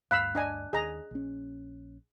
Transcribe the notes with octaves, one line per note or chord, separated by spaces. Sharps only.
D2 G2 F5 B5 E6 F#6
D4 D#5 G#5
D#2 G#4 D#5 A#5
A#1 C#4